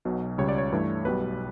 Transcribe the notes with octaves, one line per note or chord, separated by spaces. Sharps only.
B1 B2 F#3
C#2 C#3 G3 C#5
D5
C#5
G2 E3 A3
B1 B2 G3 B4